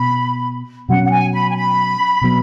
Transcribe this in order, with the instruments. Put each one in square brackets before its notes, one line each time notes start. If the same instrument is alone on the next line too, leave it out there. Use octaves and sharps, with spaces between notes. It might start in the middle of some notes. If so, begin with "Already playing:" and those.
Already playing: [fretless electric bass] B2 B3 [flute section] B5
[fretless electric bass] B2 F#3 C#4 [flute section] F#5
[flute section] F#5
G#5
B5
G#5
B5
[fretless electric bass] B2 F#3 B3